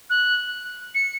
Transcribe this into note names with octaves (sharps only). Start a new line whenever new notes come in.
F#6
C#7